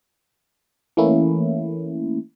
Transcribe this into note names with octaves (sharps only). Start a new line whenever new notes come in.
E3 A3 A#3 C#4 E4